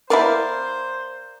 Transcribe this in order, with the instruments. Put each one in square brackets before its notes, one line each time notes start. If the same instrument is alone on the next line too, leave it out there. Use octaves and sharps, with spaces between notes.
[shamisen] B3 E4 [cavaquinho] A#4 D5 F5 [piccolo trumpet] C5